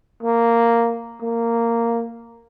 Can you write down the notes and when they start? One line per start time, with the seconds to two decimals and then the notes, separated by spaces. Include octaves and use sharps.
0.22 A#3
1.21 A#3